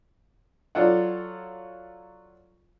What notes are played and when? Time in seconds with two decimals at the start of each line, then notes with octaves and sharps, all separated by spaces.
0.75 F#3 F4 A4 D5 F#5